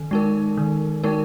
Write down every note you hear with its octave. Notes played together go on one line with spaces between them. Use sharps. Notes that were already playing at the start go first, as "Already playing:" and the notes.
Already playing: D#3
G#3 D#4 A#4
D#3
G#3 D#4 A#4